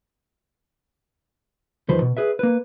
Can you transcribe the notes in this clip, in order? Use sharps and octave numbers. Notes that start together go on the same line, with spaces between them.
E2 D#3 F3 B4 C5
B2
G#4 B4 E5
A#3 B4